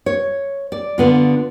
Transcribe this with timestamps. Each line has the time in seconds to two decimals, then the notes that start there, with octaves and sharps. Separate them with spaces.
0.06 C#5
0.72 D5
0.98 D3 B3 F4